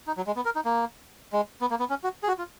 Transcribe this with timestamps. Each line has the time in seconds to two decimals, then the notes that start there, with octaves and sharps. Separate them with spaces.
0.07 D#4
0.17 F#3
0.27 G#3
0.36 B3
0.45 A#4
0.55 D#4
0.65 A#3
1.33 G#3
1.61 B3
1.70 A#3
1.80 B3
1.90 C#4
2.04 F#4
2.23 G#4
2.28 F#4
2.38 F4